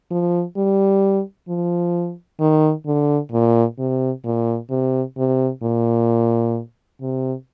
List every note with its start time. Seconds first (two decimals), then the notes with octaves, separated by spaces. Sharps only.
0.11 F3
0.57 G3
1.49 F3
2.40 D#3
2.86 D3
3.32 A#2
3.79 C3
4.25 A#2
4.70 C3
5.17 C3
5.63 A#2
7.01 C3